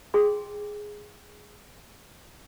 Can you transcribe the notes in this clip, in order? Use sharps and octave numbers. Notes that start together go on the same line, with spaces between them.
G#4 G5 C6